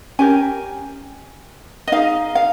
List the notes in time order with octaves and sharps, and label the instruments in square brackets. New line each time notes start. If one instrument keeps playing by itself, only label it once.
[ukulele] C#4 G4 A#4 G#5
D#5
D#4 G#4 F5
F5